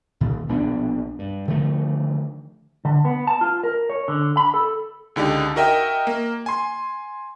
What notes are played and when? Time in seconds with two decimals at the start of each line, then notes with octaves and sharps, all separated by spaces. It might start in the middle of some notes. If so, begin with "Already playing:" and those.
0.21 A#2 D#3
0.49 A#1 B2 B3 D4
1.19 G2
1.48 D3 D#3 F3 A3
2.85 D3
3.05 B3
3.27 A5
3.41 F4
3.64 A#4
3.90 C#5
4.08 D3
4.37 B5
4.54 A4
5.16 C#2 D3 D#4 G4
5.56 F#4 A#4 D#5 E5 G5
6.07 A#3
6.46 G#5 C6